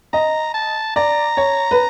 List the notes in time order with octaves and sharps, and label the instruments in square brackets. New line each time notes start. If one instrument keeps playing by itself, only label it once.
[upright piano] D#5 [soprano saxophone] A#5
[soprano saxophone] A5
[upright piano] D5 [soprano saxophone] A#5
[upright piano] C#5
B4